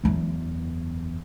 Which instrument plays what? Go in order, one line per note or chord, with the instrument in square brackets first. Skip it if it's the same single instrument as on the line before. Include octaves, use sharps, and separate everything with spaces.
[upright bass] F#1 E2